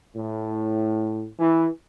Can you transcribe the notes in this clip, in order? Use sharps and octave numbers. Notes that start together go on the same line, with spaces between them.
A2
E3